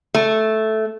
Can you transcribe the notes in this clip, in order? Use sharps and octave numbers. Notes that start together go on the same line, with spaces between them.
A3